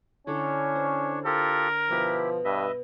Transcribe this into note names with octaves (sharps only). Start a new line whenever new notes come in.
D3 C#4 D4 E4 A4 C#5
C5
F4 G4 A4 A#4
B2 F3 E4 G4
G2 B4 D#5 E5